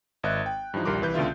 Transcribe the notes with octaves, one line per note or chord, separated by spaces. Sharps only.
G#1 D#5 E5 F#6
G5
G2 E3 F3 D#4
A#1 D#2 G3 A#4 C6 D6
C2 E3 B4 G6
C#2 B2 D3 F4 E5